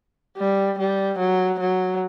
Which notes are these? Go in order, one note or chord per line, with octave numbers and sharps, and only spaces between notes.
G3
G3
F#3
F#3